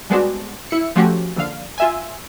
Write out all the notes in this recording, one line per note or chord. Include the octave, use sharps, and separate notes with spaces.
G3 G#3 B3 C4 D4 F#4
E4 C#7
F3 A3 C#4 F#4 G4
A#1 D3 F5
F4 E5 G#5